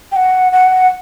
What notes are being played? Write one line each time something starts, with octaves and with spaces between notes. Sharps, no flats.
G5
F#5
F#5